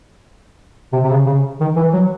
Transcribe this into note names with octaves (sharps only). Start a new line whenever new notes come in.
C3
C3
C#3
C#3
D#3
E3
F#3